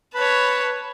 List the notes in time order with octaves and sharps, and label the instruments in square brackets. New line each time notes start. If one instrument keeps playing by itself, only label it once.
[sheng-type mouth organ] B4 B5 [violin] C#5 A5